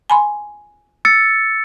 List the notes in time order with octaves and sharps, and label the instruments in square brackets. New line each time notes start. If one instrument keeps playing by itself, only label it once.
[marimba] G#5 B5 C6
[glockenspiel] E6 A6 C#7